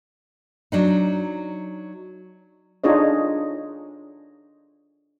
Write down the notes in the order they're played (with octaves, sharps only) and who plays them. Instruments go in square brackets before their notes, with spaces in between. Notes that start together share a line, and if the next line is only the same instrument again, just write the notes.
[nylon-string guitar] F#3 D4 D#4
[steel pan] D4 D#4 F4 G#4 C#5 D#5